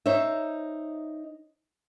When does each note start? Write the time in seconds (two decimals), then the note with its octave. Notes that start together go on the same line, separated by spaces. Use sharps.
0.06 D#4 C5 C#5 E5